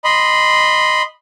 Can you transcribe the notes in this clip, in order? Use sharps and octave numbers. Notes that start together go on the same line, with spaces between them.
D#5 B5 C6